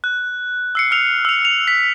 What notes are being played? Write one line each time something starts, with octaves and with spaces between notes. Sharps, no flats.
F#6
E6 C7 C#7
E6 F6 C#7 F7
E6 F7
F7
B6